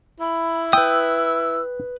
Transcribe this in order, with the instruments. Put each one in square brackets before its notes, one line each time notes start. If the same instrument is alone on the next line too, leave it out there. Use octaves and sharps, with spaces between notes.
[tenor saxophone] E4 [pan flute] B5
[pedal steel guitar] B4 D#6 [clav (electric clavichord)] G5 [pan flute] E6